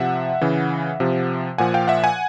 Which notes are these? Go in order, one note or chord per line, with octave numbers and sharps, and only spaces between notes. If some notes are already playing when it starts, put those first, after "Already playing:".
Already playing: C3 F3 E5 F#5
C#3 E3
C3 F3
A#2 F3 F#5 G#5
F5 G5
E5 F#5
F#5 G#5